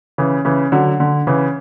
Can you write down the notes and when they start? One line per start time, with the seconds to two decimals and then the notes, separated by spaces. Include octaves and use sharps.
0.18 C#3 E3
0.45 C#3 E3
0.72 D3 F#3
1.00 D3
1.27 C#3 E3